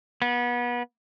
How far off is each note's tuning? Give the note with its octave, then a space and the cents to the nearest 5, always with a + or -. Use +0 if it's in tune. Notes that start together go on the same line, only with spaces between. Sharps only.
B3 -30